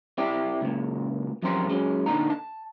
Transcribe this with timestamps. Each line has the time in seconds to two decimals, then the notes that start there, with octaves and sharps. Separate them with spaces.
0.18 C4 E4 G4 D5
0.61 C#2 A#2
1.42 F#2 F3 G3 C4 A#4 C6
1.69 F#3 G#3 C#4
2.06 A#2 D3 D4 D#4 A#5
2.30 A5